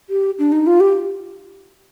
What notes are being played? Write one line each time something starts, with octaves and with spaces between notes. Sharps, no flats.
G4
D4
D#4
F4
G4